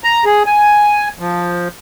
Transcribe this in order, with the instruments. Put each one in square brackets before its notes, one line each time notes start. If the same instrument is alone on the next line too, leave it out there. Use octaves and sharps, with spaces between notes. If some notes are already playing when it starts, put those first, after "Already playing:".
[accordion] A#5
G#4
G#5
F3